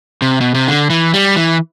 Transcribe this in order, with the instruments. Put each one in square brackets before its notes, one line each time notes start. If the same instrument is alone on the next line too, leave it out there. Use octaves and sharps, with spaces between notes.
[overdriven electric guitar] C3
B2
C3
D3
E3
G3
E3